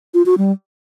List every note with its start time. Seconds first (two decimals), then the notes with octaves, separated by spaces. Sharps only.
0.14 F4
0.26 F#4
0.38 G3